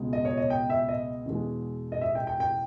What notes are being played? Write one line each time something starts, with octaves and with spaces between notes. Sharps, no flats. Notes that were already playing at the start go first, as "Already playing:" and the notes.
Already playing: C#2 B2 G#3
D#5
C#5
D#5
G5
E5
D#5
E2 B2 G#3
D#5
E5
G5
G5
G5